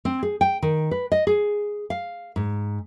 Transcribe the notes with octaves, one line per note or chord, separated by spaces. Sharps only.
C4
G#4
G5
D#3
B4
D#5
G#4
F5
G#2